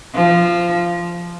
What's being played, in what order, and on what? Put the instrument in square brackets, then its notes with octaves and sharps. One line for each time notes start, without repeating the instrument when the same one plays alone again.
[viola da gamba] F3